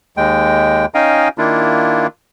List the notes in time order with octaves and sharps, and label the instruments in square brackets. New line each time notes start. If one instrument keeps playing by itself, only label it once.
[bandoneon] D#2 G#3 G5
C#4 D#4 D#5 F5 G5 G#5
D#3 A#3 D4 E4 F4